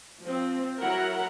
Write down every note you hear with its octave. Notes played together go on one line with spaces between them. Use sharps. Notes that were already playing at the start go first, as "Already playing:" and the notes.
F3 C4
F#3 E4 A#4 F#5 A#5